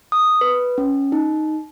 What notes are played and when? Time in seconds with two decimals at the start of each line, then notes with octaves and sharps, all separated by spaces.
0.12 D#6
0.41 B4
0.78 C#4
1.12 D#4